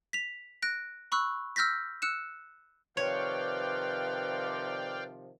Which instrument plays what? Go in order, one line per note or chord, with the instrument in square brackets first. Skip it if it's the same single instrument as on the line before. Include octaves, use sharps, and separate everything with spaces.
[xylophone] B6 F7
F#6 A#6 D7
B5 C#6 E6 F#6
E6 F6 G6 A#6 B6
E6 F#6 C#7 E7
[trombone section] C3 D#3 F3 [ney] B4 [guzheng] C#5 [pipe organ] D5 F5 G5